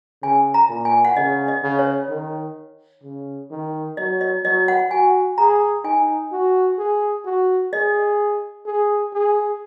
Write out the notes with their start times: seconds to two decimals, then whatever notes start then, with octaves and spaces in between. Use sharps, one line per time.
0.22 C#3 G#5
0.54 A#5
0.69 A#2
0.85 G#5
1.05 F#5
1.16 C#3 D#5
1.48 D#5
1.63 C#3
1.79 C#5
2.09 D#3
3.03 C#3
3.51 D#3
3.97 F#3 D#5
4.21 D#5
4.44 F#3 D#5
4.68 F#5
4.91 F#4 G#5
5.38 G#4 A#5
5.84 D#4 G#5
6.32 F#4
6.78 G#4
7.25 F#4
7.72 G#4 D#5
8.65 G#4
9.13 G#4